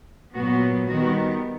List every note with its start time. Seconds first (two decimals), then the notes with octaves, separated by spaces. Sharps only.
0.33 A#2 F#3 B3 F#4
0.87 D#3 G3 B3 F#4